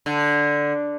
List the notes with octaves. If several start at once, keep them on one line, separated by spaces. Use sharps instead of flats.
D3